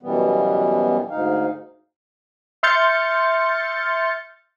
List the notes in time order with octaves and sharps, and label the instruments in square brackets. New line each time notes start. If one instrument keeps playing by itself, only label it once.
[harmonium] F#2 B2 E3 G3 B3
D2 G#2 D#4 F5
[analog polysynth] E5 C6 F6 G6 A6 C#7